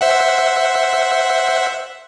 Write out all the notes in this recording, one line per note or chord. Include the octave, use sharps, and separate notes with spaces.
C5 E5 F#5